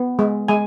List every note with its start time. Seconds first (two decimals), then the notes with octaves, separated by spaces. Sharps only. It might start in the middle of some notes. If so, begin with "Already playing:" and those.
Already playing: B3
0.19 G#3
0.48 G#3 G#5